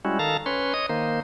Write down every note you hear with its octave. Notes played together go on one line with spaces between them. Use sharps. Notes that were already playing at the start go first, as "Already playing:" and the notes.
G3 G#3 C#4 E4 F#4
D#3 A4 F5 A5 A#5
C#4 B4 C#5 C6
C#5 D#5 D#6
D#3 A#3 C5